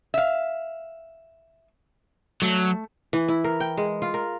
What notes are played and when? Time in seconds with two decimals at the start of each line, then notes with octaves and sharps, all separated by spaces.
0.14 E5 F5
2.42 F#3 A3
3.13 E3
3.28 E4
3.44 A#4
3.60 G5
3.77 G#3
4.02 F4
4.14 A#4